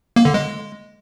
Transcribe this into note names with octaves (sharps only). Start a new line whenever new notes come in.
A#3
D3
G#3